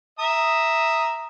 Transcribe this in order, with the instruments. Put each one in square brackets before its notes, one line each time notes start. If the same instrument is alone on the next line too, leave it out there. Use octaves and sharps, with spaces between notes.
[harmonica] E5 A#5 D#6